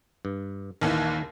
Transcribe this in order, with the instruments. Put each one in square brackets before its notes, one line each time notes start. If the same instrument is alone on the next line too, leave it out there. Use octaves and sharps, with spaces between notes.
[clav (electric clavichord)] G2
[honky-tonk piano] A#1 D#2 E3 [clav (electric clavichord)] D#3 A#3